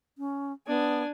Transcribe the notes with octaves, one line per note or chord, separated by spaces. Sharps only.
C#4
B3 D4 G#5